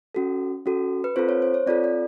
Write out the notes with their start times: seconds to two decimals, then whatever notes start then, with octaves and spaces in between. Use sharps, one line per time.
0.15 C#4 F#4 A4
0.66 C#4 F#4 A4
1.04 B4
1.16 C4 F4 A4 C5
1.29 C#5
1.42 C5
1.54 C#5
1.67 C4 F4 A4 D5
1.84 D5